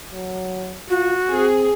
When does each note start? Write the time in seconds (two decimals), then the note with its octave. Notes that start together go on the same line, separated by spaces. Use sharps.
0.12 F#3
0.89 F4 F#4
1.31 C4 G#4